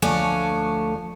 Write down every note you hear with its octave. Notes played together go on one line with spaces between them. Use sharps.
D2 F3 A3 D4 C#5 G#5